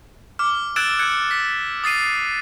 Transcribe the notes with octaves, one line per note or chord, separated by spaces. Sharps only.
D6 F6
E6 F#6 G#6 A6 D7 E7
F#6 G#6 C#7
B6
D#6 A6 C7 D#7